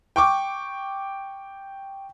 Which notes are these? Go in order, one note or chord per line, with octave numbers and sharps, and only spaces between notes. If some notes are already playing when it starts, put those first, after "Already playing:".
G5 C#6 D6